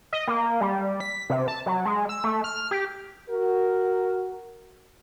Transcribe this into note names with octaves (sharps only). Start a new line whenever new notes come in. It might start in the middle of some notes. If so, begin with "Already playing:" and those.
D#5
A#3
G3
B6
C3
A5
F#3
G#3
E6
A3
F6
G4
F#4 A#4